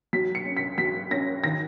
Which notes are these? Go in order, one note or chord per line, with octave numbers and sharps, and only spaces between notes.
F#3 B6
C#7
C#4
B6
F#3 B6
C#4 A#6
D#3 A#6